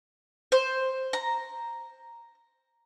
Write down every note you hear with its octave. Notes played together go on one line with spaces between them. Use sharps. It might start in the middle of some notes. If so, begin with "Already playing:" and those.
C5
A#5